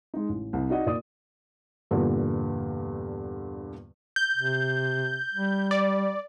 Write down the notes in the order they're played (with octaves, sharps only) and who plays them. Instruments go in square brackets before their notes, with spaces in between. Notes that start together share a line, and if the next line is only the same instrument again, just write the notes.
[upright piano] G#3 D#4
A1
C2
D#4 F#4 D5 D#5 F#5
A#2 D5 D#6
[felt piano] E2 G2 A#2 D3
[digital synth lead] G6
[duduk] C3
G3
[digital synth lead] D5